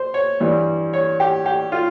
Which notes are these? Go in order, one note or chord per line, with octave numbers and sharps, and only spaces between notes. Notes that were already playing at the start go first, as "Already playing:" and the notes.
Already playing: C5
C#5
G2 E3 G3
C#5
G4
G4
F4